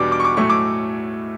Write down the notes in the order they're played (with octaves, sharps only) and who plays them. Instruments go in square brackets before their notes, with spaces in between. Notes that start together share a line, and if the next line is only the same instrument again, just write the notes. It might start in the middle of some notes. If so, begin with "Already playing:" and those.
Already playing: [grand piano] E2 B2 G3 B3 D4 D6
D6
C#6
D6
A2 F#3 A3 C#6
D6